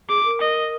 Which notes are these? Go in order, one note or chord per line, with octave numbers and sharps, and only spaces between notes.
G#4 D6
A#4
D#5